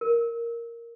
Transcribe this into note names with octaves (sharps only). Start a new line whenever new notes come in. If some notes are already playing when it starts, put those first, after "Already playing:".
A#4